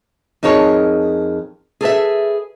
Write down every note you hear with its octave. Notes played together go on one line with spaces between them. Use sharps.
F2 D#4 G#4 A#4 C#5 A5
G#4 A4 B4 E5